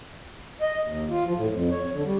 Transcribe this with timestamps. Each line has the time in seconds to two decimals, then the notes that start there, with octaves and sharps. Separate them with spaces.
0.61 D#5
0.84 D#2
1.10 F4
1.25 F3
1.37 A2
1.52 F2
1.71 C#5
1.94 D3
2.05 G3